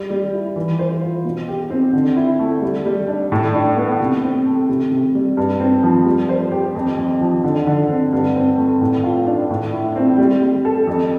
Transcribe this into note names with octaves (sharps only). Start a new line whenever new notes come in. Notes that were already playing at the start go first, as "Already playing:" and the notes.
Already playing: G3
G3
E4
E3
C5
F4
B2
G4
C4
D3
E4
A3
G3
G3
D4
A2
D4
B3
C3
C4
A3
C3
C3
G3
G2
C4
F3
G3
C5
G4
F2
F2
F3
D3
D3
C4
G2
C4
A3
A2
F4
D4
A2
E4
C4
G3
G3
A4
F2